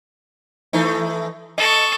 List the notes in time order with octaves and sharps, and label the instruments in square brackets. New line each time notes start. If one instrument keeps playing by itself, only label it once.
[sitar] E3 A3 D#4
[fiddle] A4 C#6 [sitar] D#5